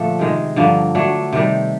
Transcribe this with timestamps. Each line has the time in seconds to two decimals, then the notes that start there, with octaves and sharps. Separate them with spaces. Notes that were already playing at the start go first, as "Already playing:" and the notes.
Already playing: A#2 D3 F3 A3 D4
0.19 C3 D#3 G#3
0.56 G2 D3 F3 A#3
0.95 F#3 A3 D4
1.33 C3 D#3 G3